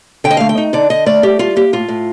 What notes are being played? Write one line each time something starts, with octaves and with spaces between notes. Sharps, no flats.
D3 G5
D#5
A3 F5
G5
D#4
D3 D5
D3 D#5
A3 D5
A2 G4
G3 F4
A#3 G4
A2 F4
A2